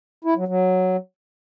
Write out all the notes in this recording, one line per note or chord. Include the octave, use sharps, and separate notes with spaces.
E4
F#3
F#3